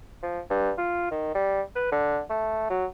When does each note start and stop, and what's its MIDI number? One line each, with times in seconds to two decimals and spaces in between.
0.23 0.40 53
0.50 0.72 43
0.78 1.09 65
1.11 1.31 51
1.35 1.62 55
1.76 1.89 71
1.92 2.21 50
2.30 2.67 57
2.70 2.86 54